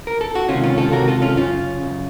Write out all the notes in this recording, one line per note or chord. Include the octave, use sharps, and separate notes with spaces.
A#4
A4
F#4
C#2 C3 D#3 C#4 F4
C#4 F4
F4 A4
C#2 C3 D#3 F#4 A#4
F4 A4
C#4 F4
F#2 C#3 C#4 F4
F#2 C#3